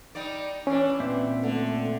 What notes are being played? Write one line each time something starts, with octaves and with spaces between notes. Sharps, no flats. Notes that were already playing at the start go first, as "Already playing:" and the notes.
G3 D#4 D5
E3 C#4 D4
A#2 B3 C4 E5
D3 A3